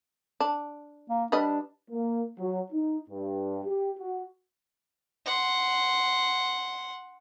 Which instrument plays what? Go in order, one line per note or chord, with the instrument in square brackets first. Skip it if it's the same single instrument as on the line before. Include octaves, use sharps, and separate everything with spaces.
[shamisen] D4
[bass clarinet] A#3
[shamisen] G3 B4 D#5 [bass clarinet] D4
[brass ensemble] A#3
F#3
D#4
G2
G4
F#4
[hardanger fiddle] F#5 C6